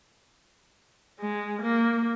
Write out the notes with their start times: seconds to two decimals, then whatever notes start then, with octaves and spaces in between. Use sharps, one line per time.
1.19 G#3
1.62 A#3